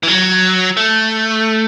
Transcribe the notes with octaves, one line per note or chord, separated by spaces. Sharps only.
E3
F#3
A3